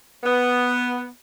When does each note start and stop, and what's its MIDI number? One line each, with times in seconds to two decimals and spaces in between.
0.24 1.07 59